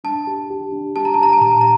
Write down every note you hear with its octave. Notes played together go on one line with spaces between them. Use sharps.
D4 A5
G4
G4
D4
G4 A5
A#5
G4 A5
A#5
A5
A#2 A#5
A5
A#5